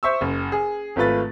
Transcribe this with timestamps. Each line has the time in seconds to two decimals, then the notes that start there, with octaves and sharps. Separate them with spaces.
0.03 C5 E5 C#6 E6
0.21 F#1
0.52 G#4
0.96 G#1 A3 F4 B4 A6